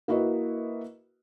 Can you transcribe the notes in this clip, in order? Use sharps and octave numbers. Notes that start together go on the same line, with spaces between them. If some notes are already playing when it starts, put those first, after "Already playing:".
A#3 E4 F#4 B4 D#5